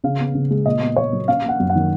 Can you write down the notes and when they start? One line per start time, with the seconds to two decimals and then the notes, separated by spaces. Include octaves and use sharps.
0.04 C#3 F5
0.20 B3
0.35 C#3
0.51 G#3
0.65 A#2 D#5
0.81 B3
0.96 A#2 C#5
1.13 F#3
1.28 C#4 F5
1.44 A#3 F#5
1.60 F#2
1.70 F#5
1.75 D#3